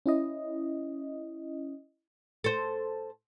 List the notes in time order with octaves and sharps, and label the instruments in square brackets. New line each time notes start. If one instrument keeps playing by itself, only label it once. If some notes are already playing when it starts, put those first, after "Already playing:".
[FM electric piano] C#4 E4 D#5
[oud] A4 C5